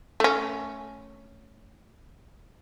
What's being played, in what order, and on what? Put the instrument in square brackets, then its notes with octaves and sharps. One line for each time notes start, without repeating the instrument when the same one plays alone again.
[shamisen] A3 C#4